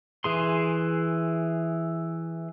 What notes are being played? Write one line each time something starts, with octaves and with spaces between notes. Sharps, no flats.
E3 G#4 C6